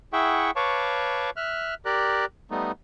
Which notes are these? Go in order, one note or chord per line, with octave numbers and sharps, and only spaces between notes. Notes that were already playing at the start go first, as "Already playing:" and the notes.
E4 G#4 E5 F#5 G5 C#6
B4 C#5 F5 A5 C#6 D6
E5 F6 F#6
G4 A#4 D5 F#6
G3 A3 B3 D#4